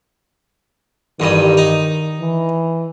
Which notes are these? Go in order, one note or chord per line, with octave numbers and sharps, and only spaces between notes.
A1 G2 D#3 D#6
D#4
E3